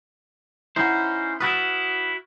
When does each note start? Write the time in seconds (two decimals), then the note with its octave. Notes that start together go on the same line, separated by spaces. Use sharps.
0.76 C#4 D#4 E4 C5 F#5
1.40 E4 F#4 B4 D#6 F6 A6